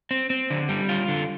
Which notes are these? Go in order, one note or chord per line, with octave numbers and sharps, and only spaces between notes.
C4
C4
D3
G3
F4
D3